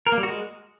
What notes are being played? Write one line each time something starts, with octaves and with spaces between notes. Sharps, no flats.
A#4
A#3
G3
F#4
G#3